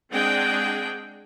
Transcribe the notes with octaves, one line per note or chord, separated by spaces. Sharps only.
G#3 C4 D4 G#4 F#5 G5